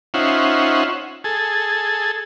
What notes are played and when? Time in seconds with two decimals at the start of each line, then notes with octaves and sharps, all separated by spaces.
0.14 C#4 D#4 F4 C5 E5 F#5
1.24 G#4 A4